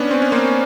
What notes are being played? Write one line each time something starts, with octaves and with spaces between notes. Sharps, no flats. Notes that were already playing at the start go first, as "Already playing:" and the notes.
Already playing: B3 C#4 D4
C4
C#4
A#3 C4